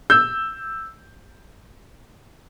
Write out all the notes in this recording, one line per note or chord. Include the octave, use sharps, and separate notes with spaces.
E6 G6